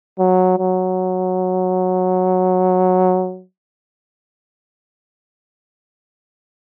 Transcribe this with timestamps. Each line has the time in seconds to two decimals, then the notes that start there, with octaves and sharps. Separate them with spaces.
0.19 F#3
0.59 F#3